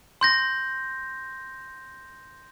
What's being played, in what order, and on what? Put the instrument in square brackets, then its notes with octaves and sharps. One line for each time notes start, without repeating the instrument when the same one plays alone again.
[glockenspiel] C6 G6 A#6